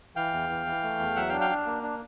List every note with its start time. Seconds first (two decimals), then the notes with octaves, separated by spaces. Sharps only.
0.16 E3 F5 G5
0.33 E2
0.49 E3
0.66 E3
0.83 A3
0.99 E2
1.16 F#3 E5 F#5
1.29 F5 G5
1.33 D4
1.41 F5 G5
1.50 D4
1.66 A#3
1.83 D4